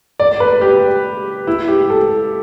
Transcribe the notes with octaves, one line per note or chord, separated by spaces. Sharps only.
D5
B4
G4
E4
G4
A4